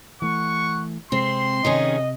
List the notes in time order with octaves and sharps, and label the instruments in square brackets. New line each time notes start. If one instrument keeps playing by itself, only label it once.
[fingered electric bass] E3 A3 [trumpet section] F#5 C#6
[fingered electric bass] C3 G#3 [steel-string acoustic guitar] C4 [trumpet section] C6
[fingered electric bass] C3 [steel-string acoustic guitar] D#3 C#4 G#4 [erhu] D#5